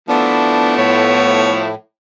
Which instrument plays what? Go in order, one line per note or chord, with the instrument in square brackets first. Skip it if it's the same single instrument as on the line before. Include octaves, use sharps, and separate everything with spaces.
[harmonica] F3 A3 E4 [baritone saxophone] B3 [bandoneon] D4
[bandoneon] A2 [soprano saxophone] C#5